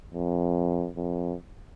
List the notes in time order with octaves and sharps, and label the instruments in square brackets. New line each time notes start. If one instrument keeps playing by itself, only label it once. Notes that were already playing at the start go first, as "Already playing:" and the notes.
[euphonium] F2
F2